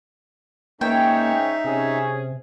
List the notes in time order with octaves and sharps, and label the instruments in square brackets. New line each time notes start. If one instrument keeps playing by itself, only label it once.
[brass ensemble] G#2 C#4 C#5 [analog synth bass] A#3 [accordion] D#4 E5 [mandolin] G5
[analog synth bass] C3 [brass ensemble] C#4 G#4